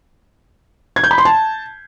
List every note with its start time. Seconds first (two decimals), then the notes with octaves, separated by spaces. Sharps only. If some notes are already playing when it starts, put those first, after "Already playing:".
0.96 G#6
1.04 G6
1.11 B5
1.18 C6
1.25 A5